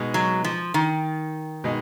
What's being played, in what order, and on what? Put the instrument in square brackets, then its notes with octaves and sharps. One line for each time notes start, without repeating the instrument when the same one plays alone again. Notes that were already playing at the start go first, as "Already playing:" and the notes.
Already playing: [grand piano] B2 G#3 D#4
[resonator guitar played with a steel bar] F#3
F3
D#3
[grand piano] B2 G#3 D#4